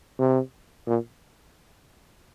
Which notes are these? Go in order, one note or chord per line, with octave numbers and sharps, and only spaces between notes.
C3
A#2